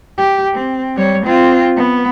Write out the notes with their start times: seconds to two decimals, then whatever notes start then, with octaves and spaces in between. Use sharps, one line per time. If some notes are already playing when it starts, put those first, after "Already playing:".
0.18 G4
0.54 C4
0.96 G3 C#5
1.25 C4 F4
1.77 B3